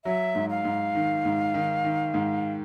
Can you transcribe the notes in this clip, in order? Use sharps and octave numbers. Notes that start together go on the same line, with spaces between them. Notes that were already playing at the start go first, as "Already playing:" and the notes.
F#3 E5
G#2
F5
G#2
D#3
G#2
D#3
D#3
G#2